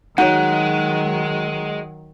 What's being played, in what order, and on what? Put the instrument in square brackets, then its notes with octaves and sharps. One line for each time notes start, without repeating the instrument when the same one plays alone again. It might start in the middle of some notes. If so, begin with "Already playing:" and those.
[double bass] D#3 F#3 [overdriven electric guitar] G#3 [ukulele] D#4 F#4 C#5 [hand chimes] F#5